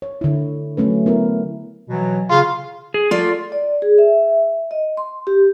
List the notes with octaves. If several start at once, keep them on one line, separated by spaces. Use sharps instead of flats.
C#5
D3 E4
F#3 A3 C#4 B4
B3 E4 A#4
B2 E3 F#3
C#3 F4
G#4
A3 F4 D5
D5
G#4
E5
D#5
C6
G4